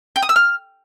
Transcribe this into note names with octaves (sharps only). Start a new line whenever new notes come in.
G5
D#6
E6
F6